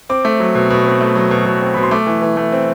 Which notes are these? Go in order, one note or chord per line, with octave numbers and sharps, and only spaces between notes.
C4 D6
A3
F#3
B2
B2
C4
A3
F#3
B2
B2
C4
B2 B5
C6
A3 D6
E3
E3
A3
C4